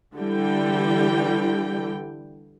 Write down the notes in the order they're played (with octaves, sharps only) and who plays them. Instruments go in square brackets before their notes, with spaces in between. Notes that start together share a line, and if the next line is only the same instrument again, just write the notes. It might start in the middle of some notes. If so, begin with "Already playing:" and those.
[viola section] D3 E3 G3 G5